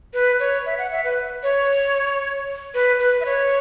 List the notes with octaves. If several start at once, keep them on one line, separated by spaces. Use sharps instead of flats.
B4
C#5
E5
F#5
E5
B4
C#5
B4
B4
E5
C#5